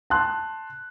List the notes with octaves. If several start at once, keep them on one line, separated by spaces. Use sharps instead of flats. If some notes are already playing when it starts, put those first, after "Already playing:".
A5 C6 F#6